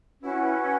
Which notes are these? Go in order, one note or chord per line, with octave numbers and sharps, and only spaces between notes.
C#4 E4 F#4 B4 F#5